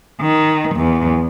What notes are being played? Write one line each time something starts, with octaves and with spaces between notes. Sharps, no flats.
D#3
E2